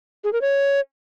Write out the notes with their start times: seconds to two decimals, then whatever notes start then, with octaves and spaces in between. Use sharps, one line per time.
0.24 G#4
0.33 A#4
0.41 C#5